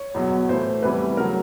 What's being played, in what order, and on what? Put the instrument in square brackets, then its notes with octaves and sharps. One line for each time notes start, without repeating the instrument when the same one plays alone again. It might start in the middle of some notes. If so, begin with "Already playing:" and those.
Already playing: [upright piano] C#5
E2 B2 F#3
A2 E3 A3 C5
E2 C3 E3 G3 B4
C#3 F#3 A3 A#4